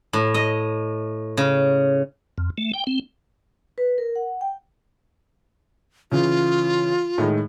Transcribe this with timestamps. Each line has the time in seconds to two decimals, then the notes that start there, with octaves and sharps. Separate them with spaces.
0.13 A2
0.34 D#5
1.37 C#3
2.38 F2
2.58 A3
2.73 G5
2.87 C4
3.78 B4
3.98 A#4
4.16 F#5
4.41 G5
6.12 C#3 E3 F4
7.18 A2 D#3 G#3